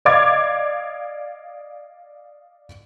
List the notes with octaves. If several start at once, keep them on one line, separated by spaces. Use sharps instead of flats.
D5 D#5 F5 D6 G#6 A6